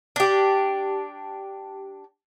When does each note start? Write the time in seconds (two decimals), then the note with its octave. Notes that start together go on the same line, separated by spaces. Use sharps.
0.16 D4 G4